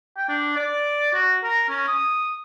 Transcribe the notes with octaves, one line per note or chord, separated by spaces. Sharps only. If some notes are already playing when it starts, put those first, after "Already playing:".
G5
D4
D5
F#4
A#4
C#4
D#6